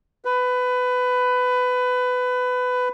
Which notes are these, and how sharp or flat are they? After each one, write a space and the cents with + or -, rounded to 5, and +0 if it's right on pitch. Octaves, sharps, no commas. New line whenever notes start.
B4 +20